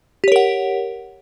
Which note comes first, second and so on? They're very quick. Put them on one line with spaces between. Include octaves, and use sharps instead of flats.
G4 C#5 A#4 F#5